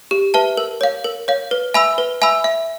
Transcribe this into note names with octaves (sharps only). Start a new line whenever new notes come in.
G4
B4 E5 A5
A#4
C#5 F5
A#4
C#5 F5
B4
E5 G#5 B5 E6
B4
E5 G#5 B5 E6
E5